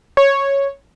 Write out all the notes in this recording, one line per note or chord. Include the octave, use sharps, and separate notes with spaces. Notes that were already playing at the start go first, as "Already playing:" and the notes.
C#5